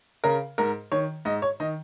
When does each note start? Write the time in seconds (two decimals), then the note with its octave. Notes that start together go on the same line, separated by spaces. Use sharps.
0.24 C#3 A#4
0.58 G#2 A#4
0.92 D#3 C#5
1.25 G#2 D#5
1.42 C#5
1.60 D#3 D#5